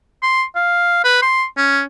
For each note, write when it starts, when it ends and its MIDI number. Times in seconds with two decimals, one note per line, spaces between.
0.23 0.43 84
0.55 1.02 77
1.04 1.18 71
1.22 1.45 84
1.57 1.82 61